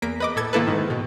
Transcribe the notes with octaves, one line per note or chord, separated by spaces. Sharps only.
E2 A#3 B6 D7
B4 D#5 D6
A2 A4 G#6 A6
D#3 A#3 E4 A4 B4
G#2 D#3
B2